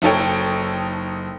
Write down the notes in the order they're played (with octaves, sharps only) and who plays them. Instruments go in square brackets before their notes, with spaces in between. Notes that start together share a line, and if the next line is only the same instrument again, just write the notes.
[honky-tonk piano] F#1 D#4 A4 C#5 G5